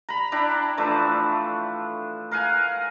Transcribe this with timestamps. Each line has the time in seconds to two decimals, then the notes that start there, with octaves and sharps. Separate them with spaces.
0.09 A#5 B5
0.32 D4 E4 G5
0.78 E3 F3 A3 D4
2.31 A#4 F5 F#5 G#5